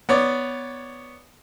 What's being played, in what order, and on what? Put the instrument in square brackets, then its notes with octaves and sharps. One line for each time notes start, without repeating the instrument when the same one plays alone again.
[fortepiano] B3 C#5 D5